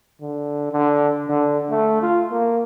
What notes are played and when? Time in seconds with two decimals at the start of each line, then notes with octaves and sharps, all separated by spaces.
0.21 D3
0.72 D3
1.28 D3
1.70 A3
2.02 F4
2.32 A#3